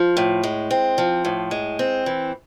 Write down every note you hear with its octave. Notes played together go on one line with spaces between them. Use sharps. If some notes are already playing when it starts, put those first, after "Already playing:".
Already playing: F3
A2
G#3
C4
F3
A2
G#3
C4
E3